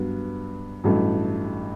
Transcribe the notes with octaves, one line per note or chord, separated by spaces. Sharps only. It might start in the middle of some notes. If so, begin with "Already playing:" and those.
Already playing: G2 F#3 B3
A1 G2 F#3 A3